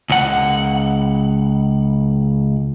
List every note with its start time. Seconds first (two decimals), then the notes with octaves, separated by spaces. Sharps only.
0.10 C#2 F#5